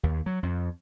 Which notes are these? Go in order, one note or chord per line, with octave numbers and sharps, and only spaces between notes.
D#2
F#3
F2